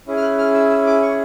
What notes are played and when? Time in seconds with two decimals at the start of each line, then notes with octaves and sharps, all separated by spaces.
0.07 C#4 E4 G#4
0.17 F6
0.22 F#6
0.38 F6
0.54 E6
0.70 E6
0.87 D6
1.02 C#6